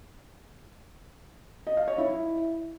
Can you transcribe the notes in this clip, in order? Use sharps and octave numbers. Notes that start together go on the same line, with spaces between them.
D#5
F5
C#5
E4